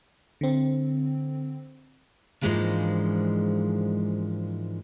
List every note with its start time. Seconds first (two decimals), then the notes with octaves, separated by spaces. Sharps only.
0.41 D3 C4
2.41 G#2 E3 F3 G#3 A#3 D4